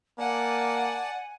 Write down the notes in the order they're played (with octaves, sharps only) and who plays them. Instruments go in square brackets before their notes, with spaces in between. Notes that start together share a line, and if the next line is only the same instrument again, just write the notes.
[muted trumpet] A#3 [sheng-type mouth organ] D5 A5 [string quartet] F#5 [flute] G#5